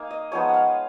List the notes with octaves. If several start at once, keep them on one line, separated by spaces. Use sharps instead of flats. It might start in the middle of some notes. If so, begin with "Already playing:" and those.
Already playing: A#3 D#4 F5 G#5
D#5
F3 G#3 B3 D#4 C#5
F5 F#5